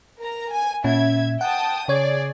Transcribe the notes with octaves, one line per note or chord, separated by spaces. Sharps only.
A#4 A#5
G#5
A#2 C#4 E5 G#6
F#5 G5 A5 D#6
C#3 G#4 C#5 D5 G#6